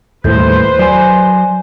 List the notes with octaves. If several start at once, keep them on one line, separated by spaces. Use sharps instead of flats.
D#2 A2 G3 E4 A4 B4 C5 G6
F#3 D5 G#5